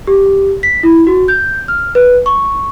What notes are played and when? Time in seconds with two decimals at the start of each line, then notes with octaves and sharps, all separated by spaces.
0.07 G4
0.63 B6
0.83 E4
1.07 F#4
1.28 G6
1.68 F6
1.95 B4
2.26 C#6